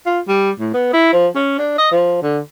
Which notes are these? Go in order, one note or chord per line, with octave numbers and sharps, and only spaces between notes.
F4
G3
A2
B3
E4
F3
C#4
D4
D#5
F3
D3